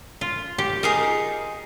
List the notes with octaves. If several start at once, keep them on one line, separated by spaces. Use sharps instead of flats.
F4
G4
D#4 F4 G#4 A#4